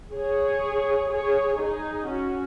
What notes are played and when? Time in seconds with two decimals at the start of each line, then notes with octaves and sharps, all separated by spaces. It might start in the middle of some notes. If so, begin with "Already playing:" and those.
0.13 G#4 C#5
1.10 G#4 C#5
1.58 D#4 G#4
2.07 C#4 F#4